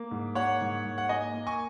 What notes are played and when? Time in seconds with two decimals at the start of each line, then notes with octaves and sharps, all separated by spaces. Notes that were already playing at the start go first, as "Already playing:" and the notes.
Already playing: A#3
0.11 G#2
0.35 A#3 C#5 F#5
0.61 G#2
0.85 G#2
0.98 F#5
1.09 A#3 D#5 G#5
1.34 A#3
1.47 G#5 C#6